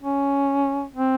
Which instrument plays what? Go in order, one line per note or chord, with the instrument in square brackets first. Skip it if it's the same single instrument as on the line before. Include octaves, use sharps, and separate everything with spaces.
[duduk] C#4
C4